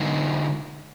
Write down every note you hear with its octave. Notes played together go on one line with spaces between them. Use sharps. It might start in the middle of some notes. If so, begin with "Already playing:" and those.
Already playing: D3 G#3 D#4 G#4